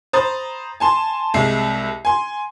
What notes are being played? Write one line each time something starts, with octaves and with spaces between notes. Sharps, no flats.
C5 A#5 B5 D#6 A6
G#5 A5 C6
C2 G#3 E5 C7
G#5 C6